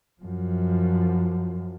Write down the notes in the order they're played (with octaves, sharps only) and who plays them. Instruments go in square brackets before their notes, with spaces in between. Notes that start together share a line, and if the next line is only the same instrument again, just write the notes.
[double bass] F#2 F3